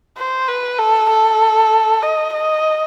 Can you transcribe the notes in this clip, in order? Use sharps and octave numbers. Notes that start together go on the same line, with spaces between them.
C5
B4
A4
A4
D#5
D#5